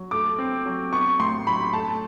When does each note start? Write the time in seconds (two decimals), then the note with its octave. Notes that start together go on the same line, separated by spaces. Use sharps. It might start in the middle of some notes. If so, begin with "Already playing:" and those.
Already playing: F#3
0.11 A3 D6
0.39 C4
0.66 F#3
0.92 B3 C#6
1.20 A2 C6
1.47 F#3 B5
1.73 A3 A5